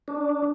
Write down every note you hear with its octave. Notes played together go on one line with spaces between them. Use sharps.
D4